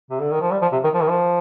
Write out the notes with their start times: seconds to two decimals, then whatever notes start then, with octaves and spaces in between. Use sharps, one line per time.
0.11 C3
0.21 D3
0.31 D#3
0.41 F3
0.52 G3
0.62 F3
0.72 C3
0.84 D#3
0.94 F3
1.02 D#3
1.10 F3